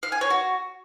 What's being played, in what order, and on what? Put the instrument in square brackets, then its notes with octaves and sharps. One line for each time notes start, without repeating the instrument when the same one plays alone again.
[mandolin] F5
G#5
C#5
F#4